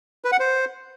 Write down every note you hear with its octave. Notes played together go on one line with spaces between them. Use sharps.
B4
F#5
C5